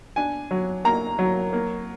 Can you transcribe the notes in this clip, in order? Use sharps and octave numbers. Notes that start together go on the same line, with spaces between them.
D4 G#5
F#3
A#3 A#5
F#3
A#3